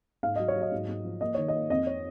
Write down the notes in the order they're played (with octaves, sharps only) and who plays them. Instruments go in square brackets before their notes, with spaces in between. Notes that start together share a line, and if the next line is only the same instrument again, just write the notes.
[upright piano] G#2 F5
F#3 D#5
C#5
F#3
D#5
G#2
G#2
F3
A#3 D#5
D#3 C#5
D#5
A#3
F2 D#5
C#5